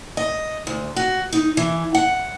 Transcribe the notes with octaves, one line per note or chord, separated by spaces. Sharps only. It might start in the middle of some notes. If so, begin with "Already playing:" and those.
D#5
D2
F#4
D#4
E3
F#5